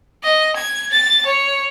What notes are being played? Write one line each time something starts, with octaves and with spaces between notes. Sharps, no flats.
D#5
G#6
A6
C#5